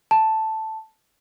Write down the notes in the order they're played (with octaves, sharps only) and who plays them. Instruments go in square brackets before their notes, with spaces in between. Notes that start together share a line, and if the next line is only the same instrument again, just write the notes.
[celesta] A5